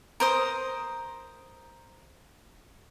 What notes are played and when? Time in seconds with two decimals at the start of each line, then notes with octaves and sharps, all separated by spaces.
0.20 A#4 C5 D#6